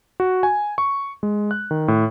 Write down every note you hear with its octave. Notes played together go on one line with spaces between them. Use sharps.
F#4
G#5
C#6
G#3
F#6
D#3
A2